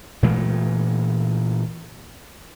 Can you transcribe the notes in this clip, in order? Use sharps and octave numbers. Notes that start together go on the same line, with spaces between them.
A#2 E3 G#3 A3